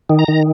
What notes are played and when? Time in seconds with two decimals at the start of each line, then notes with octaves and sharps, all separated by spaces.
0.10 D#3
0.19 A#5
0.28 D#3